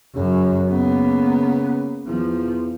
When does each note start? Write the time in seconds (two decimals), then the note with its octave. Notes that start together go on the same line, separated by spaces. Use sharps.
0.15 F#2 C#3
0.69 C#3 A#3 B3
2.07 E2 F3